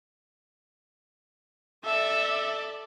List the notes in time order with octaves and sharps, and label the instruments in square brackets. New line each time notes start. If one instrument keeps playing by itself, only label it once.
[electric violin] A4 D5 [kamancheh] E5